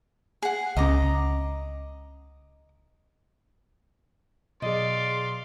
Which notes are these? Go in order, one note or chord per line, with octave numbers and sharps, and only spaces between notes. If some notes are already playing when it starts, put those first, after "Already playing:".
G#4 F#5
C#2 C#4 D#5 A#5 D6
B2 F#3 G#4 D5 D#5 F5 C6